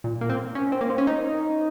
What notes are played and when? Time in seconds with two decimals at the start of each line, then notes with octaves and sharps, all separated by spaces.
0.04 A#2
0.21 A#3
0.30 C4
0.55 C#4
0.72 C4
0.81 A#3
0.90 C4
0.98 C#4
1.07 D#4